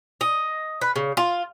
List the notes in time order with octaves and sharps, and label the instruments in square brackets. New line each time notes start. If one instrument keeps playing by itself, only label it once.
[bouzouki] D#5
B4
C#3
F4